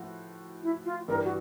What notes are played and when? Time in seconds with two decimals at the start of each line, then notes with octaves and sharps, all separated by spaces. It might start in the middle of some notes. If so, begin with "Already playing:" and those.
Already playing: A2 F3 F#4
0.63 E4
0.85 F4
1.08 G2 E3 G3 A#4
1.24 F#4